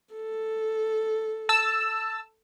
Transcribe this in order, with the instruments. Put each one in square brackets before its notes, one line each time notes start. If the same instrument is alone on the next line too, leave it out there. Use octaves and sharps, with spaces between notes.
[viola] A4
[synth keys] A5 E6